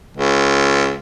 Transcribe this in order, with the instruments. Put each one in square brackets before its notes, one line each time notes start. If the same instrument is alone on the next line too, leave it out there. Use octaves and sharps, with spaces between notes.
[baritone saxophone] C#2